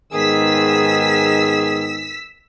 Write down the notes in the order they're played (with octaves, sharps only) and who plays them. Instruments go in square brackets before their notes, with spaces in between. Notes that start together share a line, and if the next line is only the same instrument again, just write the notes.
[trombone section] G#2 D#3 B3 [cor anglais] G#4 [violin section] E6 B6